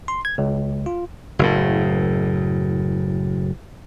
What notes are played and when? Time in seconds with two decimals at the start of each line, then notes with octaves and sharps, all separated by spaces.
0.08 C6
0.25 G#6
0.38 C#2
0.86 F4
1.39 F#1 A2